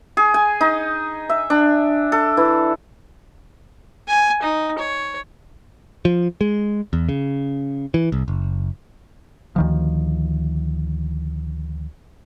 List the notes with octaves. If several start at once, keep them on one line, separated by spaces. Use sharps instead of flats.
G#4
G#5
D#4
E5
D4
A4
E3
G#5
D#4
C#5
F3
G#3
E2
C#3
E3
C2
F#1
D2 D#3 F3